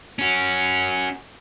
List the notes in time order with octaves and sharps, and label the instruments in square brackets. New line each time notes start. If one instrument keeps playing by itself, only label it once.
[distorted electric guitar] C#4 F#4